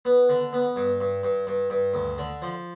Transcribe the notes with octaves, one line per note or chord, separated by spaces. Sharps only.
B3
D3
B3
G2
G2
G2
G2
G2
D2
D3
F3